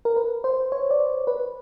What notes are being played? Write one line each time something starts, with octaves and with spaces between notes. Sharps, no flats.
A#4
B4
C5
C#5
D5
B4